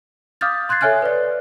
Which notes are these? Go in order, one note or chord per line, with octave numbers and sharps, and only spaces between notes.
F5 D6 D#6 F6 G6 A6
C6 F#6 G#6 A6 C7
A4 C#5 E5 G#5 F6 F#6
B4 D5